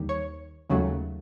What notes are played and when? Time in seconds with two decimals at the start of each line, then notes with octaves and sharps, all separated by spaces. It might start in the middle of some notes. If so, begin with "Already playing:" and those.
Already playing: D#2 D#3 G3
0.09 C#5
0.69 D#2 C#3 F#3 A3